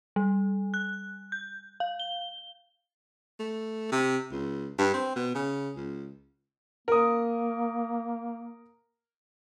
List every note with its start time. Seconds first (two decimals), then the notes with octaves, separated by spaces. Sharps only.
0.16 G3
0.74 F#6
1.32 G6
1.80 F5
2.00 G7
3.40 A3
3.92 C3
4.31 C#2
4.78 G2
4.94 C4
5.16 B2
5.35 C#3
5.76 C#2
6.88 A#3 A#4 D#6